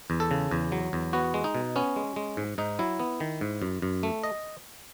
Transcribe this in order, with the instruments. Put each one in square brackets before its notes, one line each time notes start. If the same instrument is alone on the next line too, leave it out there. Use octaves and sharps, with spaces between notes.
[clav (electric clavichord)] E2
A4
C#3
E2
F#3
E2
B3 F#4
G#3
D#4
B2
B3 C#4
G#3
G#3
G#2
G#2 D#4
F#3 E4
B3
D#3
G#2
F#2
F#2
A3
D#5